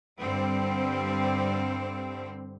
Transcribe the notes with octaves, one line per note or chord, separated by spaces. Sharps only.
G2 D3 G3 C4